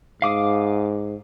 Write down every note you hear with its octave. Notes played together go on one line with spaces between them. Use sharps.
G#2 F5 D6 D#6